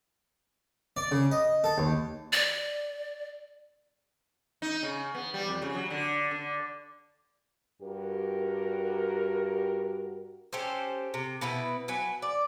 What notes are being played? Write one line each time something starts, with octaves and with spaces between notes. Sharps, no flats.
D5
C#3
D#5
A4
D#2
D5
D#4
C#3
B3
G3
F2
C#3
F#3
D3
D3
G2 F#4 G4 A#4
C#4 G4 A4 C5
C3
B2 B3 E4 B4
F#3 B4 G#5
D5